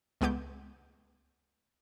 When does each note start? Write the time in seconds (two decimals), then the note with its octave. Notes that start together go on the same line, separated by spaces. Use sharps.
0.21 C#2 G#3 A3 B3 D6 G6